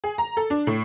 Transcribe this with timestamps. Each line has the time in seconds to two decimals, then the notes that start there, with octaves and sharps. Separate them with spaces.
0.04 G#4
0.18 A#5
0.37 A4
0.50 D4
0.67 A2